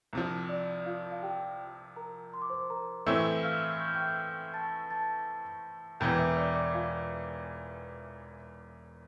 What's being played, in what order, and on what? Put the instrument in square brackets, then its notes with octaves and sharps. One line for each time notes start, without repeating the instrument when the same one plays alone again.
[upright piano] C2 C3 F3
[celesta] D5
F4 F5
F5
G4 G5
A#4 A#5
C6
D6
C5 C6
A#4 A#5
[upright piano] A2 E3 A3 C4 [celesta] E5 E6
[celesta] F5 F6
G6
F6
G5 G6
A5 A6
A5 A6
[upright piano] E1 E2 E3 [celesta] G5 G6
[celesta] D6
E5 E6
D5 D6
D5 D6
F4 F5